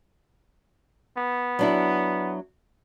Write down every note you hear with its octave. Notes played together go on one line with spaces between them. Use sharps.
B3
F#3 D4 E4